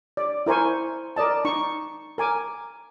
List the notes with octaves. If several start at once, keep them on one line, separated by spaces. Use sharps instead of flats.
D5
E4 A#4 C5 G#5 C#6
A#4 D5 D#5 A5
D#4 C#6
A#4 G#5 D6